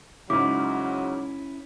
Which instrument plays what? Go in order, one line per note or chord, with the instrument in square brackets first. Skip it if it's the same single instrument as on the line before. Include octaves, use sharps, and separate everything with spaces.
[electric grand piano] G#2 C#3 [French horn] F#3 [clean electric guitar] C#4 E4 [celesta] D6